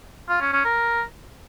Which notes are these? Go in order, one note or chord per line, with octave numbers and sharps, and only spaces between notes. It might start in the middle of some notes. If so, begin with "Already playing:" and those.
F4
C#4
C#4
A#4